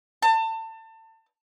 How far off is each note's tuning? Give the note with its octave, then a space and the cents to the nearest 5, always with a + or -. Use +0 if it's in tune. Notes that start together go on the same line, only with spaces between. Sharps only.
A5 +30